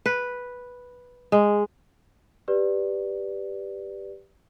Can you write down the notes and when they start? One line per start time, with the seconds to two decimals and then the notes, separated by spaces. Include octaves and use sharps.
0.06 B4
1.32 G#3
2.48 G4 B4 D5